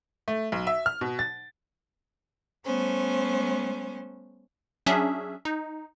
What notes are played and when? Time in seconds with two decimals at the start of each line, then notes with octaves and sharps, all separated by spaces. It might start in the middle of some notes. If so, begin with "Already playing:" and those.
0.28 A3
0.52 B1
0.67 E5
0.86 F6
1.01 B2
1.19 A6
2.65 G3 A3 B3 C#4 C5
4.86 F#3 C#4 D4 G#4 E5
5.45 D#4